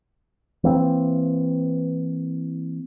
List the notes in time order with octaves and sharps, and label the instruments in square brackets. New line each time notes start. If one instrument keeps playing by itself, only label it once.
[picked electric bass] E3 A#3 C4